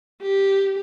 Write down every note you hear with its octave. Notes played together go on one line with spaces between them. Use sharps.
G4